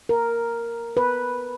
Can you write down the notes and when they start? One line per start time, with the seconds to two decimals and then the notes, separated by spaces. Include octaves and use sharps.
0.09 A#4
0.97 B4